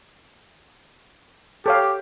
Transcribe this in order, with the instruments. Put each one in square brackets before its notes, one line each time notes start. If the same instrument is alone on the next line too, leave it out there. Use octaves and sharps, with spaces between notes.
[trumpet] G4 [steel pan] A4 C#5 F5